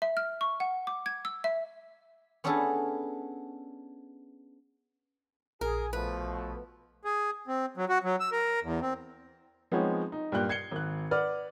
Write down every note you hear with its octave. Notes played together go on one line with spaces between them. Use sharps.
E5
F6
C#6
F#5
D6
G#6
E6
E5
B3 C#4 D4 E4 G#4 A4
A#1 G#4 A#4
B2 F3 A3 B4
G#4
C4
F#3
F#4
F#3
E6
A#4
E2
C4
F3 G#3 B3 C4 D#4 C#5
D#4
G2 A#2 G5 F#6
G#6 C7 C#7 G7
G#1 F#6
B4 D5 F#5 F6